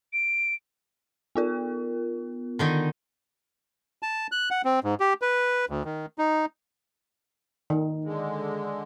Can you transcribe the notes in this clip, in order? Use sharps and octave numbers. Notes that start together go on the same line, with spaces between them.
D7
B3 F4 A#4
D3 D#3 D#4
A5
F#6
F#5
C4
G#2
G4
B4
D2
D#3
D#4
D#3
D3 G#3